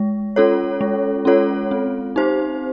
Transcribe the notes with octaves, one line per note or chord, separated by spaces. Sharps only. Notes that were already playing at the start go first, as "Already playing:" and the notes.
Already playing: G#3
C#4 F4 A4 C#5
G#3
C#4 F4 A4 C#5
C4
D#4 G4 C5